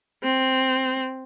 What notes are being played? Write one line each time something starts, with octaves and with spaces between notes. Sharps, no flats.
C4